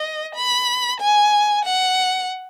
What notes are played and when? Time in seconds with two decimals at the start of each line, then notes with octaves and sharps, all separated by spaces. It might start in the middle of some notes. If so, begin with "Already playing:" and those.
Already playing: D#5
0.35 B5
1.00 G#5
1.65 F#5